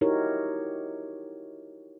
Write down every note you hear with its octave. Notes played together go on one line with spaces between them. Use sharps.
D#4 E4 F#4 G4 A#4 C#5